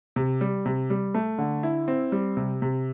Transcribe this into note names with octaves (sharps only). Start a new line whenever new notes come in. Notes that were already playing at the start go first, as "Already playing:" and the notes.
C3
G3
C3
G3
A3
D3
E4
C4
G3
C3
C3